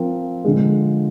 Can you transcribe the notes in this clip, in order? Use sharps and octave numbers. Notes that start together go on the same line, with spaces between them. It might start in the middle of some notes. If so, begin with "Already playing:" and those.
Already playing: F3 C4 F4 A#4
D3 F3 G#3